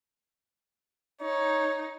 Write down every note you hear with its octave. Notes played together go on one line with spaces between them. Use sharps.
D#4 C#5